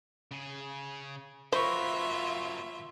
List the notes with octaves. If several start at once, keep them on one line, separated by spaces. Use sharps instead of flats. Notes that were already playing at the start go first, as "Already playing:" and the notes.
C#3 G#4
F#3 A#3 F4 C5 E5 B5 C#6